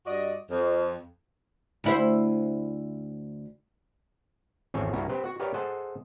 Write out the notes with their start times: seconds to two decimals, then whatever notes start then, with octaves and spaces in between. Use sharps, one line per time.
0.06 G2 F#4 D5 D#5
0.51 F2
1.84 D2 E4 C5
4.74 G#1 E2 C4 A4 C#5 G#5
4.93 C2 G2 A#3 E4 F#4 A#5
5.09 C4 G4 B4 C5
5.24 F#4 F#5
5.40 G4 A#4 B4 C#5 D5 F5
5.54 G#4 A4 C5 D#5 F#5 A5